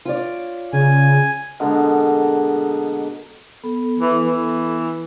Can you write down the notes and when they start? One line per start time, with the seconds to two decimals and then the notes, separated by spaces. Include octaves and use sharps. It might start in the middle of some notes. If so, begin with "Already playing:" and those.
0.05 F4 C#5 D5
0.73 C#3 G#5
1.60 B2 D3 G#3 A#3
3.64 B3 A4
3.99 E3
4.25 E3